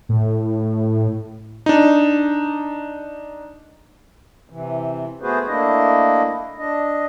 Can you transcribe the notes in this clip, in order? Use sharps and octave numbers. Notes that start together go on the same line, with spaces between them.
A2
D4 D#4
C3 E3
A3 B3 F#4 G#4 B4 C5
A3 A#3 D4 E4 D#5
D4 D#5